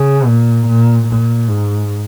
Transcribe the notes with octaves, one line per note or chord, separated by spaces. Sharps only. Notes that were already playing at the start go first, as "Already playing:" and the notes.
Already playing: C#3
A#2
A#2
A#2
G#2